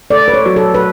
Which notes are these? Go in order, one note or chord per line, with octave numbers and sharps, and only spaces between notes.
A3 D5
B4
C#5
F#3
A4
B4